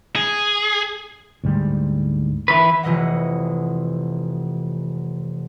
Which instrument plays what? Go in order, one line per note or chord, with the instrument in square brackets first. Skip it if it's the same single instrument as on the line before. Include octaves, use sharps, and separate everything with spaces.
[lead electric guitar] G#4
[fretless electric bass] D2 G#2 G3
[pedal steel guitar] E3 B4
[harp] F1 C3 E3 D#5 F#5